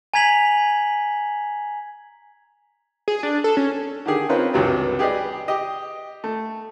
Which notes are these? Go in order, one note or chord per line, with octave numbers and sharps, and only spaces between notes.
G#5 A#5 G#6 B6 F7 F#7
G#4
D4
A4
C#4
D3 D#3 G4 G#4
C4 C#4 D#4 F4 A#4 B4
C#2 G2 C3 E3 F#3
G4 G#4 B4 D5 D#5
G4 D#5
A3